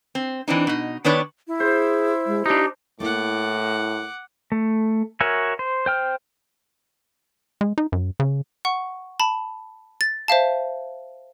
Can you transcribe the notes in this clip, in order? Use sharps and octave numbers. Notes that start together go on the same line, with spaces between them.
C4
E3 C4 D4 D#4
B2 D#4
D#3 B3 D4 B4 C#5 D5
E4
G#4 C5
G#3
D4 D#4 G4
A2 A3 A#3 E4 F#5 D6
A3
F#4 A#4 C#5 E5 G#5
C5
C5 G5 F6
G#3
D#4
F#2
C#3
F#5 C#6
A5 B5
A6
C5 E5 F5 A5